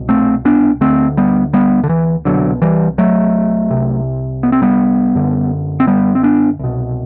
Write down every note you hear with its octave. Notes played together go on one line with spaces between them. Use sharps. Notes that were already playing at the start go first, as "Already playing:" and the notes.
Already playing: C2 B2
A3 C4
B3 D4
D2 D3 A3 C4
G3 B3
G3 B3
D3
E3
C2 B2 D3 F#3
E3 G3
F#3 A3
C2 C3
B3
C4
G3 B3
F#2 D3
C4
G3 B3
C4
B3 D4
C2 B2